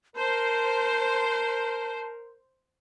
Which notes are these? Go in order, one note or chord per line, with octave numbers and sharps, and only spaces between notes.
A#4 C5 A5